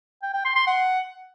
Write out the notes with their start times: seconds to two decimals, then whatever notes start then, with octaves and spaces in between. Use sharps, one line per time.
0.22 G5
0.34 G5
0.45 C6
0.56 C6
0.67 F#5